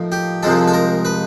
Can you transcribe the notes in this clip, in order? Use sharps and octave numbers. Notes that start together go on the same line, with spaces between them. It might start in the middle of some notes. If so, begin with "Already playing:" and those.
Already playing: A2 F3 A#3 D#4
G4
C2 C3 F3 G#3 A4
A4
A#4
B4